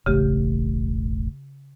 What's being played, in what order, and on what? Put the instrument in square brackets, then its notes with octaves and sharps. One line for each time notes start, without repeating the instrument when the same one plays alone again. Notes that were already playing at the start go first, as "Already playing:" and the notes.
[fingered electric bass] E1 A1 A3 [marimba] C#3 G4